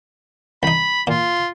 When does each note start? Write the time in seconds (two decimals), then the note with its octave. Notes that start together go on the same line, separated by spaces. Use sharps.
0.63 C2 D#4 B5
1.07 A#2 F4